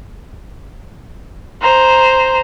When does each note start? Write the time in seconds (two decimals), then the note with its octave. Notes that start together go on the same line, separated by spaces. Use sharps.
1.62 C5 A#5